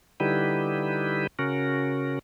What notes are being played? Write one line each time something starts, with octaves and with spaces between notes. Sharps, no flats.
D3 G3 D#4 E4 G4 B4
C#3 C#4 F#4 A#4